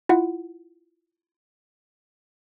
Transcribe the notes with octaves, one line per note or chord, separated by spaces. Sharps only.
E4 F4 F#5